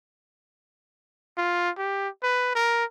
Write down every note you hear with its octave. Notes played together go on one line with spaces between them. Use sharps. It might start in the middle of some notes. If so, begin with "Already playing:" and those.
F4
G4
B4
A#4